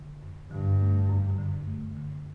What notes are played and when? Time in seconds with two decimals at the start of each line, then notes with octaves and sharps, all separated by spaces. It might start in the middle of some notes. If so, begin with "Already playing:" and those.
Already playing: D3
0.23 F#2
0.51 G2 D3
0.81 A3
1.09 F#2
1.39 D3
1.67 A3
1.97 D3